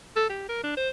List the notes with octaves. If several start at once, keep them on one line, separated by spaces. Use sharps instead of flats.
A4
G4
A#4
D4
C5